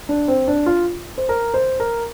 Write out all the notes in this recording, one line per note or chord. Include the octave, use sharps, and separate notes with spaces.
D4
C4
D4
F4
C5
A#4
C5
A#4